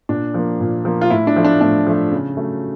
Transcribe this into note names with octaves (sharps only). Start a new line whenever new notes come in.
A#2 D4
F3 A#3
A#2
F3 A#3
F4
A2 E4
D4
F3 A3
D4
A2 D4
F3 A3
C#3
F#3 A3